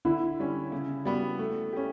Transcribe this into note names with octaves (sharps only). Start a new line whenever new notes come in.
D3 E4
G3 C#4
C#3
G3 B3 F#4
A3
C#4 G4